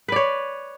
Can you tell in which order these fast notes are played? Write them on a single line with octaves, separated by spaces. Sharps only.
B4 D5 C#5